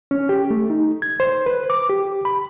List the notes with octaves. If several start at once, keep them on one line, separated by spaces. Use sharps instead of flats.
C#4
G4
A3
D#4
G#6
C5
B4
D6
G4
B5